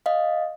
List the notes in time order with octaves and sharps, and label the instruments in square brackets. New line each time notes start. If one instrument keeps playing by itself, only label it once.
[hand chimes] D#5 F5